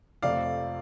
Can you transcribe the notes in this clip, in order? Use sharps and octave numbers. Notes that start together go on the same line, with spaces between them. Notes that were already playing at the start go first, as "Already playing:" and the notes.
F2 C3 F3 A3 D5 F5